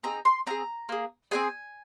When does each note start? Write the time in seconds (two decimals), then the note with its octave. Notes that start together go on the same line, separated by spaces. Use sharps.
0.03 C4 D#4 G#4 A#5
0.25 C6
0.47 C4 D#4 G#4 A#5
0.89 A#3 G#4
1.31 C4 D#4 G#4 G#5